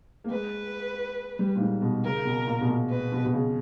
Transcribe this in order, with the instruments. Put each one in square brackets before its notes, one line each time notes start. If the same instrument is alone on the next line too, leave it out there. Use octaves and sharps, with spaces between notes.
[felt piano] A#3
[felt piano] G#3 [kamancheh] B4
[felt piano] G3
A#2
G#2
B2
[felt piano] C#3 [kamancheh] A#4
[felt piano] B2
A#2
B2
A#2
[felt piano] A#2 [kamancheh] B4
[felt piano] B2
B2
C#3